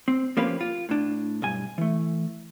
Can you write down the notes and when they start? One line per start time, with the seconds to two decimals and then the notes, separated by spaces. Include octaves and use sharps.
0.08 C4
0.37 F3 A#3 C#4 G4 B4
0.61 F4
0.89 A2 D4
1.42 B1 G2 G#5
1.78 E3 A3